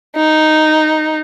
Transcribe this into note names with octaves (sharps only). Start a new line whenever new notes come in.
D#4